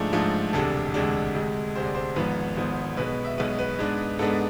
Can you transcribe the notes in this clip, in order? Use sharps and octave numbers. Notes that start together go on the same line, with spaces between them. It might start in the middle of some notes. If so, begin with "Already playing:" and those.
Already playing: G#2 F3 A3 D4 G#4
G#2 F3 A3 D4
E1 D2 C3 G#3 D4 A4
E1 D2 C3 G#3 D4
D2 C3 G#3
D2 C3 G#3 C5
D5
C5
G#1 G#2 F3 B3 B4
G#1 G#2 F3 B3 C5
B1 B2 G#3 B3 B4
E5
B1 B2 G#3 B3 B4
B4
G#2 G#3 B3 D4
G#2 G#3 B3 D4 A4